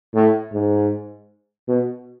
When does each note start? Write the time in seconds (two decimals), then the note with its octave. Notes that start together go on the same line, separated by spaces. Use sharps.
0.15 A2
0.53 G#2
1.68 B2